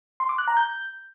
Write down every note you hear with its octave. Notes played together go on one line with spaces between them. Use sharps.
C6
D6
F#6
A#5
G6